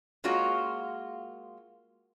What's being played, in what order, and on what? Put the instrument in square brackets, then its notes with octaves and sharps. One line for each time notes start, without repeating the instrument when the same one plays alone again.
[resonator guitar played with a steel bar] G#3 A#3 F4 F#4 C#5